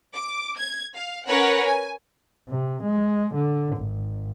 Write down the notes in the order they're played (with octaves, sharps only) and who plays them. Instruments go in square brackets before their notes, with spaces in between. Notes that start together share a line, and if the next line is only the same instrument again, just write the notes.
[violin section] D6
G#6
F5
C#4 A#4 B4 C#5 F#5
G#5
[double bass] C3
G#3
D3
G#1